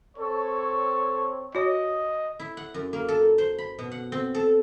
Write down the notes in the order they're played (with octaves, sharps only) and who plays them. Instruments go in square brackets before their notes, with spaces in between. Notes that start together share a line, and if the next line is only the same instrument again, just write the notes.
[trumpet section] C4 C#5 [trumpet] A4
[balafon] F#4 C#5 [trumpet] D#5
[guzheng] E4
F#5
F#2
A#3
A4
C5
B5
B2
F#5
C4
A4